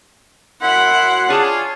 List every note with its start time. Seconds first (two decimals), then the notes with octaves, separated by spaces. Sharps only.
0.62 F#2 E4 F#5 C6
1.29 D4 F4 G#4 C#5 G#5 A5